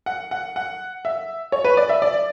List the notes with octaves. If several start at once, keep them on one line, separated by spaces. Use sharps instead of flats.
F#5
F#5
F#5
E5
C#5
B4
D5
E5
D5